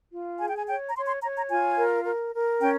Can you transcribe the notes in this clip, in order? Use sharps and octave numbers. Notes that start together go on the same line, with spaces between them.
F4
G#4 G#5
G5
G#5
C#5 G5
A#5
C#5 C6
C6
C#5 A#5
A#5
F4 G#5
A#4
A#4
A#4
C#4 G5